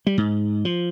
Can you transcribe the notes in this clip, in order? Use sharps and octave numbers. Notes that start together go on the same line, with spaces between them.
G3
G#2
F3